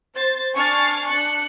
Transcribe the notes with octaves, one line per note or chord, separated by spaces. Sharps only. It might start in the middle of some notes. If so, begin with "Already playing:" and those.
C5 A6
D4 G#5 C#6 F6 A6 C7
D4 F#6 C#7